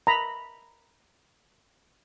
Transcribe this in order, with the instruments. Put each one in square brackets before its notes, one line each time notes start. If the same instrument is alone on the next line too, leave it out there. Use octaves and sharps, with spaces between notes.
[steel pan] A#5 B5